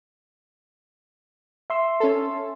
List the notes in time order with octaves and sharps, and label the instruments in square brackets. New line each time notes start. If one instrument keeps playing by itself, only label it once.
[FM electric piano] E5 C6 E6
[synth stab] C#4 A4